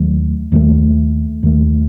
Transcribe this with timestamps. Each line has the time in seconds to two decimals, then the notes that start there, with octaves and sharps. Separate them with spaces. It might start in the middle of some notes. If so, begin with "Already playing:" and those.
Already playing: D#2 D#3 F#3 A3
0.52 D#2 D#3 F#3 A3
1.43 D#2 D#3 F#3 A3